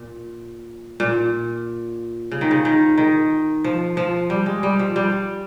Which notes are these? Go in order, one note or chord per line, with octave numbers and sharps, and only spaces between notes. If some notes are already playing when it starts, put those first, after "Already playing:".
Already playing: A#2
A#2
C#3
D#3
C#3
D#3
D#3
F3
F3
G3
G#3
G3
F3
G3